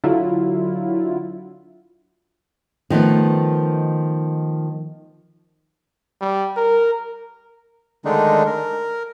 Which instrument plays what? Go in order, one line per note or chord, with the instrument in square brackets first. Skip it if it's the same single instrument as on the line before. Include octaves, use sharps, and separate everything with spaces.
[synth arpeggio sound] D3 F#3 E4 F4
[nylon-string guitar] D#3 F3 A3 B3
[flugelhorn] G3
A#4
[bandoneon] D3 D#3 G#3 A3 D4 D#4
A#4